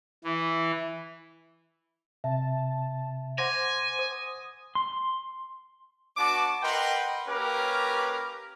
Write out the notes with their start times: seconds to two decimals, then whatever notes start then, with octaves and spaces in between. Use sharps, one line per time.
0.24 E3
2.24 C3 E5 A5
3.38 C5 F#5 G#5 C6 D6 A#6
3.99 D#6
4.75 C6
6.17 B3 D4 F#4 A5 D6
6.62 A#4 B4 D#5 F#5 G5 C6
7.27 A#3 C#4 G4 A#4 B4 D6